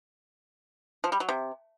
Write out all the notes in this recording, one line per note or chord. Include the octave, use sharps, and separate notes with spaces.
F3
G3
F#3
C3